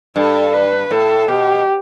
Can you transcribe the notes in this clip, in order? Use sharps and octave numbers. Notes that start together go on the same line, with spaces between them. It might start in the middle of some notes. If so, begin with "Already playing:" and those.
G2 A4
B4
A2 A4
B2 G4